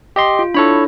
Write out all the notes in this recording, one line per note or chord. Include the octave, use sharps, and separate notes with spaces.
G4 D#5 C6
F4
D4 E4 A4 C#5 B5